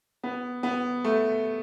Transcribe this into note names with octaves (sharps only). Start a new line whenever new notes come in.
B3
B3
A3